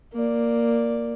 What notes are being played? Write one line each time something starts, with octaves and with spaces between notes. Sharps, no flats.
A#3 D5